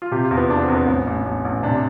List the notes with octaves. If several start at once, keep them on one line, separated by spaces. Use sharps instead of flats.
F4
C3 G4
F4
E2
B3
E2 D4
B3
C4
E2
B3
A1 B3
A1
A1
A1
C3 D4